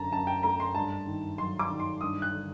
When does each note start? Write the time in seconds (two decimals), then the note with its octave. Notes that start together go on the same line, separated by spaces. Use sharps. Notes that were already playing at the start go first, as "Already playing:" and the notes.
Already playing: F#2 D3 A5 A#5
0.12 F#2 A5
0.27 G5
0.43 A3 A#5
0.60 C6
0.75 G2 A5
1.07 D#3
1.38 F#3 C6
1.59 D6
1.70 D#3
1.80 C6
2.01 G2 D#6
2.22 F#6
2.33 D3